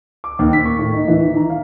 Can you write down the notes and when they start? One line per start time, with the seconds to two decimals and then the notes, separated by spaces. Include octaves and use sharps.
0.24 D6
0.39 D#2
0.53 B6
0.65 C#6
0.79 A2
0.93 D#4
1.08 E3
1.22 D#3
1.37 A#5
1.50 F5